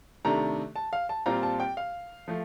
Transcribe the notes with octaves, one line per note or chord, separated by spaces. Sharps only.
C3 D#3 A3 D4 A#5
A5
F5
A5
A#2 G3 C4 F4 A#5
A5
G5
F5
F3 A3